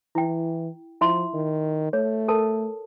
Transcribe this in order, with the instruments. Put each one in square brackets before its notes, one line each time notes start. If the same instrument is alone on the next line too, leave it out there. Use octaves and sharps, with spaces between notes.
[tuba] E3 [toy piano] E4 G5
[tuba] F3 [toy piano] E4 E5 C6
[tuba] D#3
[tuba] A3 [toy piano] C#5
[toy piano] A4 A#4 A5